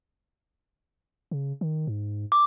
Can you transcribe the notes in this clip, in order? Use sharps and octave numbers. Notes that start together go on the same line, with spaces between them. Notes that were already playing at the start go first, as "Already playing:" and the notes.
C#3
D#3
G#2
D6